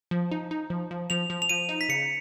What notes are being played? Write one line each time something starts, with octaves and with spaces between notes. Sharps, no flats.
F3
D#4
D#4
F3
F3
F3 F7
F3
F7
F3 D#7
D#4
B6
C#3 C#7